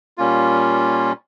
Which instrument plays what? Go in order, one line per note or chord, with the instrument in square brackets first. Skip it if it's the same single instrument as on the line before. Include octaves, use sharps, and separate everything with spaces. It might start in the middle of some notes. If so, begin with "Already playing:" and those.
[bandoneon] A#2 G3 A#3 C#4 F4